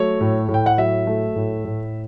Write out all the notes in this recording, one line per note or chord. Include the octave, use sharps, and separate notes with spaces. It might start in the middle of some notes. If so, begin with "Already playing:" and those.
Already playing: F#3 A3 C#5
A2
A2
G5
F#5
F#3 E5
A3
A2
A2